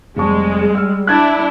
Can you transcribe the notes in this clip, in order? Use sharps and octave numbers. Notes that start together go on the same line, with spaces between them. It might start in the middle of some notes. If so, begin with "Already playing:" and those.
F1 G3 G#3 A5 C#6
E6 F6
D4 E4 F#6 G#6 A6